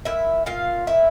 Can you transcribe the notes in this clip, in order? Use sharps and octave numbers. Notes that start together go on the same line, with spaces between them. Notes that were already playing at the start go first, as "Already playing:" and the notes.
A#2 E4 E5
A#2 F4 F5
A#2 E4 E5